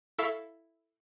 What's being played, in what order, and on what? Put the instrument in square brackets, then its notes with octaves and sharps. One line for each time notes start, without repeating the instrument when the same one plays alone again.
[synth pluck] E4 A4 E5 F5 C#6 B6